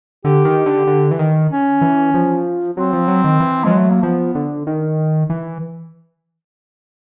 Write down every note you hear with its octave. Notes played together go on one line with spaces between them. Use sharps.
D3 G4
D#3
D3
D3
E3
D#3
C#4
E3
F3
F#3 C4
F3
F#3
D#3
E3
F3 G#3
F#3
A3
A#3
F3 B3
D3
D#3
E3